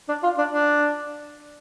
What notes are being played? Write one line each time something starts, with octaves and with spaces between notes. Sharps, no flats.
D4
F4
D4
D4